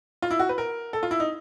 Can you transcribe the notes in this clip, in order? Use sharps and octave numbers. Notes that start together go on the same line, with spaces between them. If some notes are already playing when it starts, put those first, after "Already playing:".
F4
E4
F#4
B4
A#4
A4
F4
E4
D#4